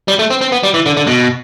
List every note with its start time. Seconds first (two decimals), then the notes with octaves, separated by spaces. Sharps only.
0.08 G3
0.19 A3
0.30 C4
0.41 C4
0.52 B3
0.63 G3
0.74 E3
0.86 D3
0.97 D3
1.07 B2